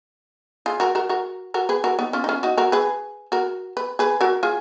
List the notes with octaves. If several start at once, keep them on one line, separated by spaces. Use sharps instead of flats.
F4 G#4
F#4 A#4
F#4 A#4
F#4 A#4
F#4 A#4
G#4 B4
F#4 A#4
B3 D#4
C#4 F4
D#4
C#4 F4
D#4 F#4
F#4 A#4
G#4 B4
F#4 A#4
B4
G#4 B4
F#4 A#4
F4 G#4